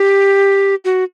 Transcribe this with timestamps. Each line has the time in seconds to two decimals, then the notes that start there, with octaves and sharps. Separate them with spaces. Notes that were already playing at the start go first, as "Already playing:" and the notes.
Already playing: G4
0.85 F#4